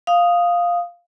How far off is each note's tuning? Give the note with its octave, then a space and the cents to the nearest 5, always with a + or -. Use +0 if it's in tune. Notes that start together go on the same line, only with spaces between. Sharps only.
F5 +0 D#6 +0